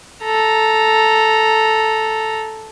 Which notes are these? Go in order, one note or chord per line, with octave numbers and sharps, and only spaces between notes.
A4 A#5